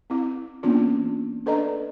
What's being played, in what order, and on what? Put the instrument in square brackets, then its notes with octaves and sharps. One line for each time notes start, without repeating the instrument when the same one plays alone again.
[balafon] C4 E4
E3 A#3 B3 C#4 D4 F4
D4 A4 B4 D5 D#5 A#5